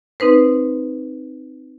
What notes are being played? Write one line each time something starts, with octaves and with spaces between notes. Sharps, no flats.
C4 D#4 B4 C5